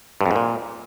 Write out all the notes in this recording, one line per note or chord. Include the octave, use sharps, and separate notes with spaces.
G2
F2
G#2
A#2